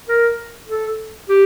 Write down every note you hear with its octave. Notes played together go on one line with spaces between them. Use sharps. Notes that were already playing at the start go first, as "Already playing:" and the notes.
A#4
A4
G4